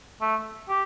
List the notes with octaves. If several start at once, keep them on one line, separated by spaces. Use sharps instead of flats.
A3
G4